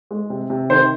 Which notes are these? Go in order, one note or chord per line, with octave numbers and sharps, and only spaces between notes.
G#3
C3
C3
D#3 C5